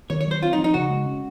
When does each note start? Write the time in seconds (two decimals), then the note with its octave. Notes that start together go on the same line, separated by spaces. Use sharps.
0.10 D#3 C#5
0.21 C#5
0.26 F#3 C5
0.42 C4 F4
0.53 D#4
0.59 F3
0.64 D#4
0.74 C#3 F#4
0.90 G#3
1.06 C#4